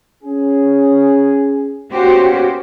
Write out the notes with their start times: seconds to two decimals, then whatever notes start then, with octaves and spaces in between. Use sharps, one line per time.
0.24 C#4 G#4
1.92 A#3 B3 C#4 F#4 G4 C5